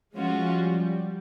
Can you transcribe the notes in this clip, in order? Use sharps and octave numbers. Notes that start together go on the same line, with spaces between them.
F3 G#3 C#4 F4 F#4
G3